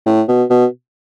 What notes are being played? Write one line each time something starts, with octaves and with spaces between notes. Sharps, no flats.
A2
B2
B2